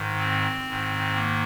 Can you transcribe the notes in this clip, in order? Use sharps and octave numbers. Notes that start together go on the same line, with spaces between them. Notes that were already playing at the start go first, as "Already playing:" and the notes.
Already playing: G#2 D#3
C4
G#2 D#3
A#3